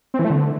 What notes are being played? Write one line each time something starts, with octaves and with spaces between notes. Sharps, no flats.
C4
E3
A3
D3